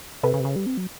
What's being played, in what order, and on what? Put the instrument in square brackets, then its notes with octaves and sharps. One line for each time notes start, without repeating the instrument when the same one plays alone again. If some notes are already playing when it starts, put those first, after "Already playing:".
[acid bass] C3 [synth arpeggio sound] A4 B4
[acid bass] C#3
C3
C#3
G3
C4
F#3